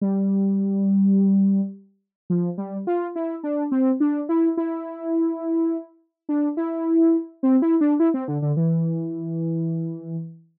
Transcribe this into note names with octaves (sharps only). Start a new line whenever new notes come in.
G3
F3
G3
F4
E4
D4
C4
D4
E4
E4
D4
E4
C4
E4
D4
E4
C4
D3
D3
E3